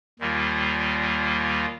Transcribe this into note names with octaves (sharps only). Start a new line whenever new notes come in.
D#2 D#3 G3 A#3 F4